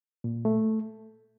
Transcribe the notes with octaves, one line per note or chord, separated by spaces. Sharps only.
A#2
A3